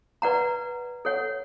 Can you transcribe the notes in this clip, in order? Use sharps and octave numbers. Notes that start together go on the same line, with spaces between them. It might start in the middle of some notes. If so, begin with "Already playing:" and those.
B4 D5 F#5 A#5
A4 C#5 F#5